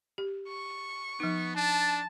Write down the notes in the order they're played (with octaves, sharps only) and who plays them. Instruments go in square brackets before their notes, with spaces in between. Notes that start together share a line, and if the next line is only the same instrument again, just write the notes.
[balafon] G4
[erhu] C#6
[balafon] F3 D#4 [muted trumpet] B3
[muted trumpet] D4 [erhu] A5